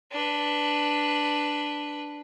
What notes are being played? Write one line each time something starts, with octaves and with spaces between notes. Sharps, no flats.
D4 B4